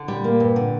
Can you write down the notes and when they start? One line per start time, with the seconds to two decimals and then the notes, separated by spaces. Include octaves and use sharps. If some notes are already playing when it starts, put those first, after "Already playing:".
Already playing: D3
0.08 A#2 G3
0.24 A#3
0.40 G2
0.56 D3